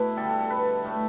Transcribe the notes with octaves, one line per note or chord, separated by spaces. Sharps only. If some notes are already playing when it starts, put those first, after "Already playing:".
Already playing: B2 A3 E4 B4
D3 G3 A4
A4
A4
B4
A2 A3